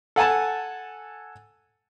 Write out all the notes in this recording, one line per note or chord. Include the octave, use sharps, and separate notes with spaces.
A4 F#5 G#5 A5